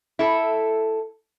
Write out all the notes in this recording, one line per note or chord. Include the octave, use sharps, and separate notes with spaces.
E4 A4